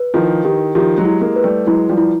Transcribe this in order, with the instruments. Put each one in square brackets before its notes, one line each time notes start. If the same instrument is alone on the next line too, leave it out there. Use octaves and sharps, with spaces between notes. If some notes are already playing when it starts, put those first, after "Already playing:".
Already playing: [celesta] B4
[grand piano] D#3 F3 [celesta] E4
[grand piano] D#3 [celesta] G4
[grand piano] D#3 F3 [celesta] G4
[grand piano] F#3 G#3
[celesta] E4
[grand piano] G#3 A#3
[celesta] B4
[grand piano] G3 A3
[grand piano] F#3 G#3 [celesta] E4
[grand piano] F3 G3
[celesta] E4